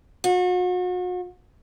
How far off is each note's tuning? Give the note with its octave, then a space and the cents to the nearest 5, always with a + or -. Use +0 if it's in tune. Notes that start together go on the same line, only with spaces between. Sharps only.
F#4 -40